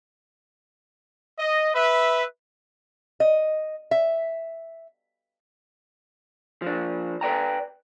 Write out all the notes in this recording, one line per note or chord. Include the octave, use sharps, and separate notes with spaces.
D#5
B4 E5
D#5
E5
F3 D4
B4 D5 G5 A#5